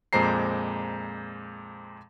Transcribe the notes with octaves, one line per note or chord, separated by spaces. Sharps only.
F2 A#2 G#3 C5 A#5 C7